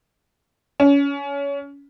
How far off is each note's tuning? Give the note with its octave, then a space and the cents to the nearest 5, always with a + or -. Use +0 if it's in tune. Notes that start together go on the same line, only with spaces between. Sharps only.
C#4 +25